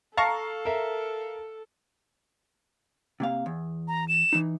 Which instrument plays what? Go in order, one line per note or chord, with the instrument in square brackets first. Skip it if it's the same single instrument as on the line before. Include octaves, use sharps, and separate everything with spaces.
[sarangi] A4 [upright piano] F5 [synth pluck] A5 A#5 C#6
[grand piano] A#4 E5
[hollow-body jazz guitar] C3 A#3 F5
E2
[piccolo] A#5
E7
[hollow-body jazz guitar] E3 D#4